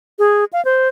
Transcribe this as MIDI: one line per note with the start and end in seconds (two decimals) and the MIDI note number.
0.19 0.45 68
0.53 0.63 77
0.65 0.88 72